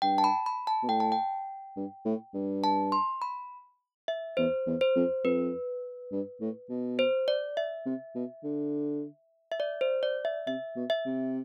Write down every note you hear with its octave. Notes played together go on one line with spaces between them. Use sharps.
G2 G5
A5
B5
B5
A5
B2
A2 G5
A5
G5
G2
A2
G2
A5
C6
B5
E5
E2 C5
E2
C5
F2
F2 B4
G2
A2
B2
C5
D5
E5
C3
B2
D3
E5
D5
C5
D5
E5
C3 E5
B2
E5
C3